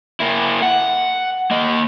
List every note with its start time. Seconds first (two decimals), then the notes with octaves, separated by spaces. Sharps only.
0.20 A#3 E4
0.62 F#5
1.51 A#3 D#5